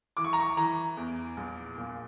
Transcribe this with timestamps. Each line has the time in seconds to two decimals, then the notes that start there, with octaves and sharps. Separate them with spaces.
0.17 E3 D6
0.24 C#6
0.33 A#5
0.40 C#6
0.57 E3 A#5
0.97 E2
1.37 A#1
1.78 A#2